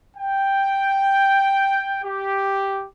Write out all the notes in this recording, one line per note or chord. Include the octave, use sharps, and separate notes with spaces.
G5
G4